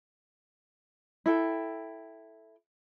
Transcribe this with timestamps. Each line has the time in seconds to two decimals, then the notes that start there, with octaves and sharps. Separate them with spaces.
1.26 E4 A4 G5